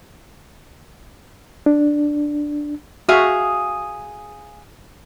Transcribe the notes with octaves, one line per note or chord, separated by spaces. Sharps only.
D4
F#4 G#4 E5 F5 D#6